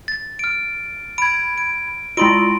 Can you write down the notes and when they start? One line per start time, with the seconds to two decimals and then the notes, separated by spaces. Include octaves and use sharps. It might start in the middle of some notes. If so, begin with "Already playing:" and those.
0.08 A6
0.39 F6 D7
1.18 B5 G#6 D7
1.58 D7
2.17 G#3 E4 F4 B5 C6 D7